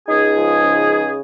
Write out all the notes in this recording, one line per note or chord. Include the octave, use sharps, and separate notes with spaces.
C#2 D#4 G#4
F3
C#3
C#2